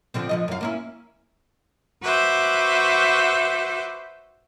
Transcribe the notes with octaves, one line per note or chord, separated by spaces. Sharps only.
D3 F3 C4
D3 F3 D#5
F#2 F5
A#3 C#4 E4
F#4 B4 C5 E5 D6